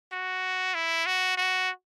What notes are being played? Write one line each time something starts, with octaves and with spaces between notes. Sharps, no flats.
F#4
E4
F#4
F#4